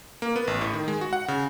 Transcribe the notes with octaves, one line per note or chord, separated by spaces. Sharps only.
A#3
B3
A1
A2
D#3
G#3
F#4
F#5
C#3